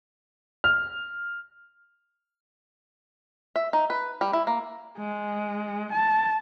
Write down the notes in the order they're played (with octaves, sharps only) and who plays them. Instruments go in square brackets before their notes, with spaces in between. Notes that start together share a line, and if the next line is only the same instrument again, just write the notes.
[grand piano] F6
[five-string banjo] E5
D#4
B4
G3
E4
A#3
[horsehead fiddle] G#3
A5